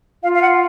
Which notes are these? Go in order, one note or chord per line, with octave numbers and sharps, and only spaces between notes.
F4 F5
F5
F#5